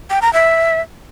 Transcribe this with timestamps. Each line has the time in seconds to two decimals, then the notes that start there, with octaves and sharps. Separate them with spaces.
0.10 G5
0.22 A#5
0.33 E5